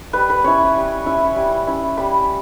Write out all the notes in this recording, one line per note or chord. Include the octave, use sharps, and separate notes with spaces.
G3 B4
B4
C#4 E4 C#5
G3
C#4 E4
G3
C#4 E4
G3 B5